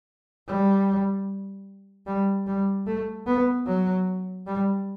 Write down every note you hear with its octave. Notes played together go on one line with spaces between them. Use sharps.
G3
G3
G3
A3
B3
F#3
G3